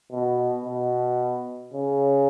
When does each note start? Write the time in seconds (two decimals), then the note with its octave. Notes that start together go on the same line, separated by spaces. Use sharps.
0.12 B2
0.65 B2
1.73 C#3